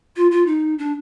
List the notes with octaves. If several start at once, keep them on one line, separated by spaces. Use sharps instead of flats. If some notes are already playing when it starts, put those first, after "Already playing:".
F4
F4
D#4
D4